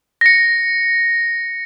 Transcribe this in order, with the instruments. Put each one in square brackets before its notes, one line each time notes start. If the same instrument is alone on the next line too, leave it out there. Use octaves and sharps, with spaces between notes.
[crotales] A#6 C#7